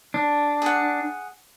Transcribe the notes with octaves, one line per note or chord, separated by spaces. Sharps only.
D4
G#4 F#5